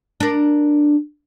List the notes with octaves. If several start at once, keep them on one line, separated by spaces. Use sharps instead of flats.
D4 A#4